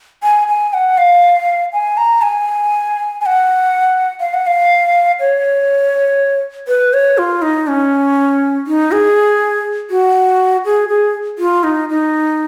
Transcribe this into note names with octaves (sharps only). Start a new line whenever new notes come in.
G#5
G#5
F#5
F5
G#5
A#5
G#5
G#5
F#5
F5
F#5
F5
C#5
B4
C#5
F4
D#4
C#4
D#4
G#4
F#4
G#4
G#4
F4
D#4
D#4